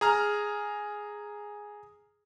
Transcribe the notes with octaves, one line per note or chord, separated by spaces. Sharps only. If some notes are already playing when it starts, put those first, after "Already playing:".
G#4 A#5 F6